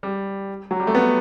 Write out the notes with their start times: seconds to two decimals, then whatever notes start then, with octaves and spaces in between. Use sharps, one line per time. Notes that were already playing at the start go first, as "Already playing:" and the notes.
0.03 G3
0.71 F#3
0.80 G3
0.87 A3
0.95 B3